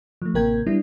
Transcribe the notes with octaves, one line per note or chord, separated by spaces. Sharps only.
F3 A3
A1 C3 A#3 A#4 G5 G#6
G3 B3 D4 E4